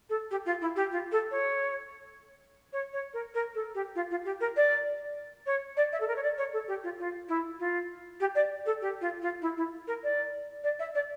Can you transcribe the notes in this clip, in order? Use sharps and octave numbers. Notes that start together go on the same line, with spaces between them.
A4
G4
F4
E4
G4
F4
A4
C#5
C#5
C#5
A#4
A#4
A4
G4
F4
F4
G4
A#4
D5
C#5
D5
E5
A4
A#4
C#5
D5
C#5
A4
G4
F4
F4
E4
F4
G4
D5
A4
G4
F4
F4
E4
E4
A#4
D5
D5
E5
D5